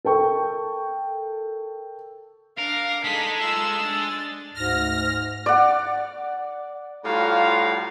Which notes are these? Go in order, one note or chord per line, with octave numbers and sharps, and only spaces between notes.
A4 A#4 G5 C#6
D4 A#4 F5 D6
G#3 D#4 G#4 A4 B6
F4 E6 E7
D4 A6
D2 G#2 F6 A#6
D5 F#5
A2 G3 F4 F#4 F5 A#5